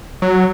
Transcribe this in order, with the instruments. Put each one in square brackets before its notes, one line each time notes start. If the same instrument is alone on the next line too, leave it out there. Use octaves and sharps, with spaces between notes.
[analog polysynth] F#3